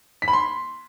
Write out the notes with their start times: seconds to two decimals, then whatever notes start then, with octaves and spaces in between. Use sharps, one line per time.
0.22 B6
0.28 B5
0.33 C6